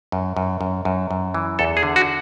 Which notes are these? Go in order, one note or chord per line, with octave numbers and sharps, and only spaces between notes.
F#2
F#2
F#2
F#2
F#2
E3
E2 A4
G#4
D3
F#4